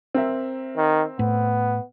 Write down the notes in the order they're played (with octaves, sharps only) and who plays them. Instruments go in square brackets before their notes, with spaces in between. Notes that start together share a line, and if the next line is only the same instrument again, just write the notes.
[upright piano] C4 A#4 E5
[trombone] D#3
[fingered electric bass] A2 [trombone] B3